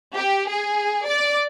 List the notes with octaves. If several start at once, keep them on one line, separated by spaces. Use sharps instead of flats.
G4
G#4
D5